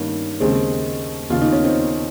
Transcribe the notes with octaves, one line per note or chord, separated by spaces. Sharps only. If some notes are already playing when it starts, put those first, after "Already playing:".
Already playing: G2 D#3 A#3 C#4
D#2 C#3 G#3 C4
D#2 C#3 F4
D#4
C#4
C4 D#4